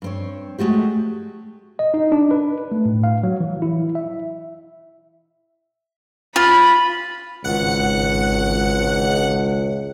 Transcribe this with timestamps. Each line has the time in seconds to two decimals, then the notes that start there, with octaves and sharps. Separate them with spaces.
0.02 G2 C4 C#5
0.58 G#3 A3 F#4 G4
1.79 D#5
1.94 D#4
2.12 D4
2.31 B4
2.72 A3
2.86 A2
3.04 F5
3.23 F#3
3.40 E3
3.62 E4
3.95 E5
6.36 F4 B5
7.44 G#1 C#2 F#5 C#7